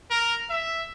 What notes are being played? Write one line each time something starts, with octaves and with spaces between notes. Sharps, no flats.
A#4
E5